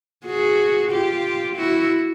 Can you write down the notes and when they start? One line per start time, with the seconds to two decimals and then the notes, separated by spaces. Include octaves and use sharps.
0.25 F#4 G#4
0.90 F4 G4
1.56 E4 F#4